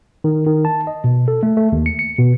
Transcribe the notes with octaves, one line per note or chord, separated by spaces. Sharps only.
D#3
D#3
A5
D#5
B2
A4
A3
A3
D#2
C#7
C#7
B2